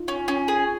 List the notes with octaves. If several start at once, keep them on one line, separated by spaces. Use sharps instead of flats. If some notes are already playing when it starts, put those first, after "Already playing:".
Already playing: D#4 F4
C#4
C#4
G#4